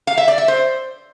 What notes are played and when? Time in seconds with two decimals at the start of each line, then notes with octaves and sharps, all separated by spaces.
0.07 F5
0.18 E5
0.28 D5
0.38 E5
0.48 C5